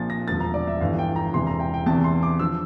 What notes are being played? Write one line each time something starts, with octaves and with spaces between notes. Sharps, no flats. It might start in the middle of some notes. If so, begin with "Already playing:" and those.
Already playing: A#1 A#2 F3 A6
A#6
E1 D2 D3 F3 A6
A#5
D5
E5
G1 G2 E3 F5
G5
A#5
E1 E2 C3 E3 C6
A#5
G5
G5
E2 C3 E3 A5
C6
D6
D3 F3 E6